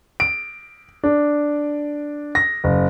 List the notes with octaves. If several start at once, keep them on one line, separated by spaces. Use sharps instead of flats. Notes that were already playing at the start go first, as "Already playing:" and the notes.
D7
D4
A#6
F#1